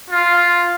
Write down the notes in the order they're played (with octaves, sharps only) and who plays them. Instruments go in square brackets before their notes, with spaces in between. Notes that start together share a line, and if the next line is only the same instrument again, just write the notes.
[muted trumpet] F4